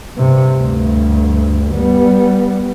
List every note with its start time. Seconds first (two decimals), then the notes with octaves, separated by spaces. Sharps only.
0.15 G2 C3
0.56 D2 G2
1.73 G3 B3